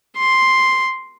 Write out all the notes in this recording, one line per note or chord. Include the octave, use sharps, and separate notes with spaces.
C6